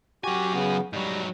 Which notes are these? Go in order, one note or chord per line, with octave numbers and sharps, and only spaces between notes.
F#3 F#4 G4 G#5
C#3 B3
G#2 F#3 G3